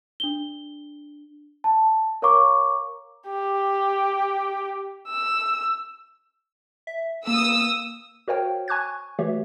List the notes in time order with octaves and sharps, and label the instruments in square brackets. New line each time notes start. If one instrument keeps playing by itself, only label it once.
[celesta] D4 G7
A5
A#4 C#5 F5 A#5 C#6 D6
[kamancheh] G4
E6
[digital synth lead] E5
[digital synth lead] A#3 [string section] D#6 E6
[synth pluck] F#4 A#4 C5 C#5 F5 G5
G#5 C#6 F#6 G#6
E3 A3 F#4 G4 C#5 E5